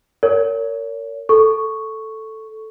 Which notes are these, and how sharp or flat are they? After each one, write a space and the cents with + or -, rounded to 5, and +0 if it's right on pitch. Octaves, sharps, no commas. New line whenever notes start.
A#4 -25 C#5 +30
A4 +0 C#6 +0